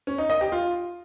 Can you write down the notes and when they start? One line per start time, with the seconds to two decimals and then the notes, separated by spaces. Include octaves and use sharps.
0.07 C#4
0.18 D#4
0.30 D#5
0.41 G4
0.52 F4